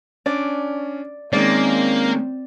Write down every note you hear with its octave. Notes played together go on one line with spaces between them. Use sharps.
C#4 D4 D5
D#3 G#3 A#3 C4 C#4 D5